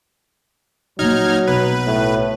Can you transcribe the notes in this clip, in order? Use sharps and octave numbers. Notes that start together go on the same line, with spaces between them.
A#2 F#3 A#3 D#4 F6 G#6
B1 D#4 B4
A2